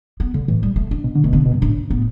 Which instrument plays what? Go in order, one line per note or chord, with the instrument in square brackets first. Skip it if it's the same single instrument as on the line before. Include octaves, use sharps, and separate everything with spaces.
[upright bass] B3
D3
[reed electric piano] A2 [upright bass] E3
[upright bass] G3
A3
D4
[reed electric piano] B2
D3
[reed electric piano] B2 [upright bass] A3
[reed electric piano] D3 [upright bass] B3
[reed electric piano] B2
G2
[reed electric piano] A2 [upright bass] D4
[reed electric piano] A2 [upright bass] B3